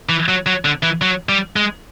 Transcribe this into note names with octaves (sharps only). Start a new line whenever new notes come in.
E3
F#3
F#3
D3
E3
F#3
G3
G#3